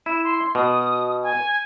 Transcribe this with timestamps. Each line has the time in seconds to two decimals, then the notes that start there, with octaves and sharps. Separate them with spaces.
0.06 E4 E7
0.24 C6
0.55 B2 D#6
1.23 G#5